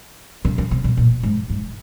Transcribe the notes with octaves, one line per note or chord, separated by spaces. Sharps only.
C#3
C#3
C3
B2
A#2
G#2
G#2